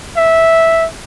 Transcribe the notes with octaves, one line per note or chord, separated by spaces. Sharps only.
E5